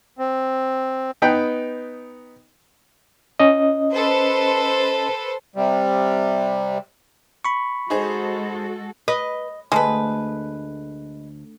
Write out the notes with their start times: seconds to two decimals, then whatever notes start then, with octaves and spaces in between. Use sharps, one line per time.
0.19 C4
1.22 B3 D#4 B4 G5
3.40 C#4 D#5
3.92 A4 B4 C5
5.56 C3 G3
7.45 B5 C#6
7.90 G#3 D#4 F#4 G#4 A4 C5
9.08 B4 D#5
9.72 D2 G#3 A4 B4